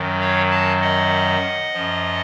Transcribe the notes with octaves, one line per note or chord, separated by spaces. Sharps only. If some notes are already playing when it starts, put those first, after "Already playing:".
Already playing: F#2 D#3 F#3
C#5 F5
F5 A5
D#5 F#5
F#2 F3